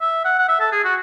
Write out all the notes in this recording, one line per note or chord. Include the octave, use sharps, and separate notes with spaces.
E5
F#5
F#5
E5
A4
G#4
F#4